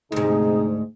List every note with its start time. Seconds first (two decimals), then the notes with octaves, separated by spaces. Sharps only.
0.12 D2 G#2 C3 D#4 G#4